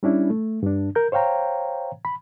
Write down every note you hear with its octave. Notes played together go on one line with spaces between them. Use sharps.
G3 C#4 D4 E4
A3
G2 D4
A#4 G6
C5 C#5 F5 G5 A#5
B5